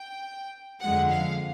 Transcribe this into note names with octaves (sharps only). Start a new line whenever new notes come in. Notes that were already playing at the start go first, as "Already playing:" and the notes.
Already playing: G5
F2 D3 F3 G#3 F#5
F5